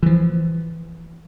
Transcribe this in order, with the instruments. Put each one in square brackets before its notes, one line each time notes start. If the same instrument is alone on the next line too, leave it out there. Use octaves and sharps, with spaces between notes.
[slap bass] E3 F3